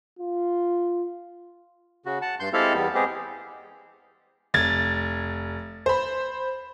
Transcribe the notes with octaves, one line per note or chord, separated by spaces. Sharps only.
F4
C#3 F#4
F#5 A5
G2 C6 G6
G#3 C4 E4 G4 A4 F5
E2 G3 B3
G#3 B3 C4 G4 G#4
F1 G#6 A6
C5 B5